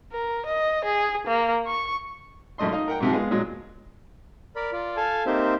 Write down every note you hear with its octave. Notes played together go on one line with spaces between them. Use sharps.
A#4
D#5
G#4
A#3
C#6
G#1 F#2 A3 D#5 C6
D#4 D#5 F5
A#4 F#5 G5
G#2 C3 F3
G#3 B3 F4 G#4
A#2 F#3 G#3
A#4 D5 B5
F4 D5
A4 F5 G#5 A5
A#3 C4 D#4 G4 C5 E5